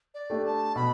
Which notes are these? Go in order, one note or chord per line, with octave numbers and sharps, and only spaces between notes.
D5
A3 D4 G4
A5
B2 B5